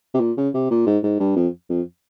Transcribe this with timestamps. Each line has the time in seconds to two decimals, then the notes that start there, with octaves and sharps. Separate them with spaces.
0.14 C3
0.20 A#2
0.37 C#3
0.54 C3
0.71 A#2
0.87 G#2
1.03 G#2
1.20 G2
1.36 F2
1.70 F2